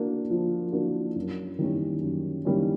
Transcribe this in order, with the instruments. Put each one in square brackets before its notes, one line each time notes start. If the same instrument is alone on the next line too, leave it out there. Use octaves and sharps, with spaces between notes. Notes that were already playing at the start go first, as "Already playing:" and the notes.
Already playing: [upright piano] A#3 D4 F#4
F3
A#3 D4 F#4
F#2
D#3 G3 A#3 C#4
F#2
D#3 G3 A#3 C#4